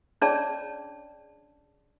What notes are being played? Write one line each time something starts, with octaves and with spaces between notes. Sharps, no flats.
C#4 D4 G#4 C#5 D5 A5